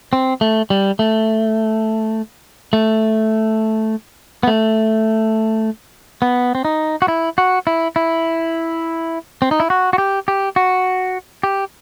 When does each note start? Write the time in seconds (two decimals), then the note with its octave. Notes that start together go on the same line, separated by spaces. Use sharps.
0.13 C4
0.41 A3
0.70 G3
0.99 A3
2.73 A3
4.43 B3
4.47 A3
6.22 B3
6.55 C4
6.65 D#4
7.02 F#4
7.08 E4
7.38 F#4
7.67 E4
7.96 E4
9.42 C4
9.51 D#4
9.60 E4
9.70 F#4
9.93 F#4
9.98 G4
10.28 G4
10.56 F#4
11.43 G4